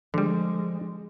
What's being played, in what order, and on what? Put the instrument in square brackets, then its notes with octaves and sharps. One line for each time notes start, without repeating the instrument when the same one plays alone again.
[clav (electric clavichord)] D3 G3 [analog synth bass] F3 [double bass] G#3